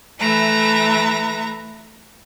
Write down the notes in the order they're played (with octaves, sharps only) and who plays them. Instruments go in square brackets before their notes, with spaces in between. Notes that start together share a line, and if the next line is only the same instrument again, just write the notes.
[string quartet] E3 A3 B4 E5 A#5